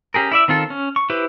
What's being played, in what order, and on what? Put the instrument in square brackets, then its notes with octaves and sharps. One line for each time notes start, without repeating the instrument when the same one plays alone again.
[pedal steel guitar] C#4 G4 G#4 A#4
E4 D5 E5
D#3 C4 F4 A4
C#4
C#6
E4 G4 B4 C5